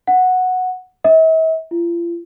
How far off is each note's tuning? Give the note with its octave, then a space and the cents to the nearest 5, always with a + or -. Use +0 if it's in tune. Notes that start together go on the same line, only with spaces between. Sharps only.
F#5 -5
E5 -45
F4 -40